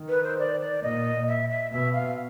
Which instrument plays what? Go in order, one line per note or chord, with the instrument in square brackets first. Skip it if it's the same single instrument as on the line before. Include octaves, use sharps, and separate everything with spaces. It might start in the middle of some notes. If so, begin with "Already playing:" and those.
Already playing: [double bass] D#3
[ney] B4
C5
D5
D5
[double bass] A#2 [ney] D#5
[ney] E5
E5
[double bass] B2 [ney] E5
[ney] F5